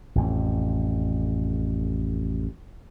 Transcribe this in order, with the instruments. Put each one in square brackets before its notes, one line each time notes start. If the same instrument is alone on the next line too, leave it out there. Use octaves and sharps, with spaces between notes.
[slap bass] A1 F2